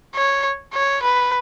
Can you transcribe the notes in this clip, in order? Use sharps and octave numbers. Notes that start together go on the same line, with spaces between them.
C#5
C#5
B4